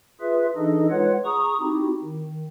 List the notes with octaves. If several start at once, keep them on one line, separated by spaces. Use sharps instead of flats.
F4 G#4 B4 E5
E3 D4 D#4 G#4 A4 D#5
G#3 F4 B4 C#5 F#5
G#4 A#5 C#6 D#6
C4 D#4 E4 F#4 G4
D#3